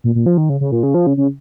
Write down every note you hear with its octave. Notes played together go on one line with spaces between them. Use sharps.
A#2
A#2
F3
D#3
C#3
C#3
A#2
C#3
F3
C#3
C#3